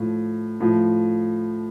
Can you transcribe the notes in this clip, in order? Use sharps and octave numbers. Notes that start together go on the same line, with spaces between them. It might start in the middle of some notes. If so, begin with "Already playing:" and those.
Already playing: A2 F3
A2 F3